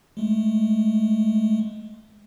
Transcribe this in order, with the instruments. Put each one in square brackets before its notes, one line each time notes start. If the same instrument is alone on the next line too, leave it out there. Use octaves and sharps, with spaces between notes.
[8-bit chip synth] G#3 A3